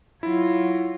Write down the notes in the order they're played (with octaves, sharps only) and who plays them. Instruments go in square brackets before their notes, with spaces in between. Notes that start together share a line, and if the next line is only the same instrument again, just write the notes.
[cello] F#3 F4 [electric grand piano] E4